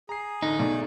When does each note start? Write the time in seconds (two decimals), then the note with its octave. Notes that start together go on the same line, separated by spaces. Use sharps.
0.09 G#4 A#5 C7
0.42 A1 D3 D#4
0.59 B1 G#2 A3 D5